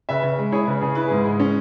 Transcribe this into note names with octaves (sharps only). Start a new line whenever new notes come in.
C#3 B4 E5
C#3
G#3
E4 G#4 C#5
C#3 B4
C#3 G#4
E4 B4
G#2 G#4
G#3
C#4